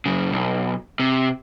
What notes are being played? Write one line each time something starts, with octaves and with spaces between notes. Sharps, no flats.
F#2 C#3
B1
C3